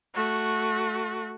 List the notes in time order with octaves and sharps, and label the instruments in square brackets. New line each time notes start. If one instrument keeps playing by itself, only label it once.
[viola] A3 F#4